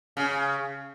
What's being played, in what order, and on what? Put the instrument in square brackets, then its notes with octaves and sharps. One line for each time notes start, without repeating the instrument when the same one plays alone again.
[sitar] C#3